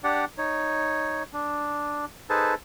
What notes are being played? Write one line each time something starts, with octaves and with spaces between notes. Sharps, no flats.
D4 G4 D5 F#5
D#4 C#5
D4
D#4 G#4 A4 B4 C5 A5